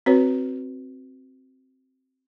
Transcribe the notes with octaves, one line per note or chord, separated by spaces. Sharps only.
C4 F#4 B4 C#5